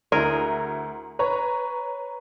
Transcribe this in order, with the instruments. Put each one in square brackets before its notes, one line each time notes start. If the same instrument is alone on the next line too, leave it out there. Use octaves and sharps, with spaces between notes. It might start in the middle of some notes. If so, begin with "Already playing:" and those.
[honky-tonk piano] D2 E4 A#5 [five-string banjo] G#4 A#4
[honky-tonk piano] B4 C#5 A#5